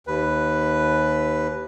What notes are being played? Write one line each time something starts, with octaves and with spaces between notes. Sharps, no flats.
D#2 B4